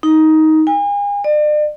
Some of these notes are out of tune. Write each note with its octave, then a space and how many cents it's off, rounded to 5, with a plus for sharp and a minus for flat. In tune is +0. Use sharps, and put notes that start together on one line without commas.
D#4 +15
G#5 -40
D5 +40